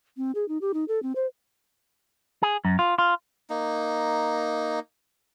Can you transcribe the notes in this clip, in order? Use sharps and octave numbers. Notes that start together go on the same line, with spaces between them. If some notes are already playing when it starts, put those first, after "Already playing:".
C4
G#4
D#4
G4
D#4
A4
C4
C5
G#4
F#2
F4
F4
A#3 D#4